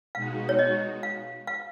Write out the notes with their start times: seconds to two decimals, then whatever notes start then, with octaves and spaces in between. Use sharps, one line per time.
0.15 B2 G#3 D#4 F#4 F5
0.49 C#5
0.59 D#5
1.03 F5
1.47 F5